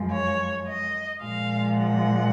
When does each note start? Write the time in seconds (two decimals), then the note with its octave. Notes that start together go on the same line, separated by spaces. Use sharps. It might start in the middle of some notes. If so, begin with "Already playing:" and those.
Already playing: F#2 F3 G#3
0.12 C#5
0.67 D#5
1.22 A#2 F3 G#3 F5
1.78 F#5